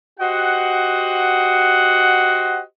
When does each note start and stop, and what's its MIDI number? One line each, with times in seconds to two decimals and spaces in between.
0.20 2.59 66
0.20 2.59 67
0.20 2.59 72
0.20 2.59 75
0.20 2.59 78